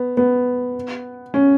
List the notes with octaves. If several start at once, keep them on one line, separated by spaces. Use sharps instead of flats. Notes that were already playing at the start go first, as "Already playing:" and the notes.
Already playing: B3
B3
C#4